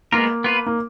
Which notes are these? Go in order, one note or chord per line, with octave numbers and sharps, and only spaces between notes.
G#3 A#3 B3 F4 A#4
B3 F4 B4
A#3